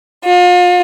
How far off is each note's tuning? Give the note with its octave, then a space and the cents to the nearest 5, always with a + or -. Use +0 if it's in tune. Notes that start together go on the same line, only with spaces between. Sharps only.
F4 +35